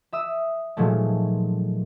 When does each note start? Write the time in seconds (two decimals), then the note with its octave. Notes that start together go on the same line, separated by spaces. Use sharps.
0.12 E5 D#6 E6
0.77 A#2 D#3 F3 F#3 G#3 A3